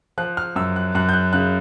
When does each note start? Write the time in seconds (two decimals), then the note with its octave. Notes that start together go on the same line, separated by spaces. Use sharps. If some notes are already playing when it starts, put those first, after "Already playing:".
0.18 F3 F#6
0.37 F6
0.56 F#2 E6
0.76 F#6
0.95 F#2 F#6
1.09 G6
1.13 F#6
1.33 C#3 F#6